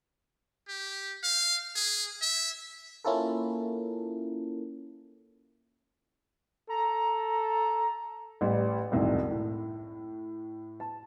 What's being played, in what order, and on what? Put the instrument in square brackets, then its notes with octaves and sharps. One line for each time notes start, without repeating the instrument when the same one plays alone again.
[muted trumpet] G4
F5
G#4
E5
[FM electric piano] A#3 C#4 E4 F4 A4 A#4
[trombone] A4 [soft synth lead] A#5
[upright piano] A1 G3 D5
E1 C2 F#2 A2 D#3
A2
A5